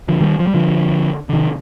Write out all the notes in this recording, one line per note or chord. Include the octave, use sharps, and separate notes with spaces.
D3 F3
D#3 G3
F3
G3
D3 F3
D3
C3 D#3